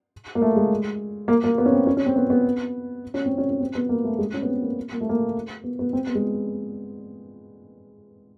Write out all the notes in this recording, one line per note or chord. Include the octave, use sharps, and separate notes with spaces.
A#3
A3
G#3
A#3
A#3
B3
C#4
C4
C#4
C#4
C4
B3
B3
C#4
C4
C#4
C#4
C4
B3
A#3
A3
G#3
C#4
B3
C4
A#3
A#3
A3
A#3
B3
B3
C4
B3
G#3